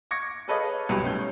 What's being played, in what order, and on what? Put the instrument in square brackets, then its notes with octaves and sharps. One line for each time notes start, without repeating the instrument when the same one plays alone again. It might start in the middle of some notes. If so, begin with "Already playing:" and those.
[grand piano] C#6 D6 G#6 A#6 C#7
G#4 A4 B4 C#5 D#5 F5
C2 F#2 B2 G4 B4
A3 C#4 G6